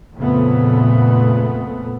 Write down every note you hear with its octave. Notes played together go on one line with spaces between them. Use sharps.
F2 A#2 C#3 A3 B3